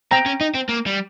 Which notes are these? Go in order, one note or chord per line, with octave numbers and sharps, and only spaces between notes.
C4 G5 A#5
C#4
D#4
C4
A#3
G3